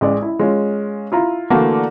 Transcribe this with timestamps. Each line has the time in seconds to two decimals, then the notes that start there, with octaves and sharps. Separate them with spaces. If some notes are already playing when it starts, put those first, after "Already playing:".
0.01 A1 G#3 D5
0.22 E4
0.39 G#3 C#4 F4
1.12 E4 F4 A#5
1.50 D3 E3 A3 A#3 D4 F#4